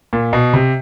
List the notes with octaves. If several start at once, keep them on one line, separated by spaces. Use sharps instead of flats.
A#2
B2
C3